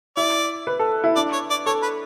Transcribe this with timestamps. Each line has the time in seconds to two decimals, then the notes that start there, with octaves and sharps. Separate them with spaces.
0.16 E4 D5
0.67 B4
0.79 A4
1.04 E4
1.16 D4 D5
1.33 C#5
1.50 D5
1.66 A4 C#5
1.82 B4